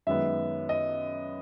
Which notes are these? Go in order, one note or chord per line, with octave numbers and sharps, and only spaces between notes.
F#2 D#3 G#3 B3 E5
D#5